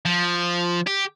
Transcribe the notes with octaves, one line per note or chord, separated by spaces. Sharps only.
F3
G4